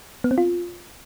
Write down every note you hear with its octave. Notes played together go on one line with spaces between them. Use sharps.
B3
C4
F4